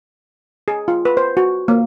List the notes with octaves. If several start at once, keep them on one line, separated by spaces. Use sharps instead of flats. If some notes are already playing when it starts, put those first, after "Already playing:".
G#4
F4
B4
C5
F#4
A#3